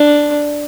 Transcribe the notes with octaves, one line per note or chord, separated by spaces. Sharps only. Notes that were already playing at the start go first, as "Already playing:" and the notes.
Already playing: D4